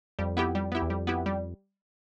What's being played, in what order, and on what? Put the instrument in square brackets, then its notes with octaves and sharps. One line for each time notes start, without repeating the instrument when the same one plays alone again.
[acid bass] F2 [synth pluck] G3
[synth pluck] B3 E4 G4
G3
B3 E4 G4
[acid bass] E2
[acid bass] F2 [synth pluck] G3
[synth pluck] B3 E4 G4
G3